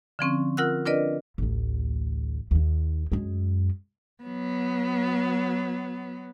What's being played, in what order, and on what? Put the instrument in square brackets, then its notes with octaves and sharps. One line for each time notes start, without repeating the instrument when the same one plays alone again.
[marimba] D3 F3 C4 C#4
F4 A#4 F#5 E6 F#6
D4 F4 A#4 B4 D5 D#5
[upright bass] A1 D2
D#2 D#3
F#2 G#3
[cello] F#3 B3